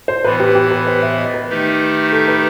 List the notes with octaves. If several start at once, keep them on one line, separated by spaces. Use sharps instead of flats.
C5
A2 E3 B3 B4
G4
G4
B4
C5
E5
D#5
B4
D#3 A3 D#4 G4
A4
B4